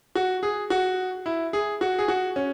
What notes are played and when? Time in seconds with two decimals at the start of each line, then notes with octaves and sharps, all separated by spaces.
0.15 F#4
0.43 G#4
0.70 F#4
1.26 E4
1.53 G#4
1.81 F#4
1.99 G#4
2.08 F#4
2.36 C#4